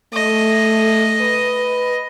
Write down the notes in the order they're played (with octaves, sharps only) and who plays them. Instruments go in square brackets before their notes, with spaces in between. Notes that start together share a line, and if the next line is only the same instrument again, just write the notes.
[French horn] A3 [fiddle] D#5
[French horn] B4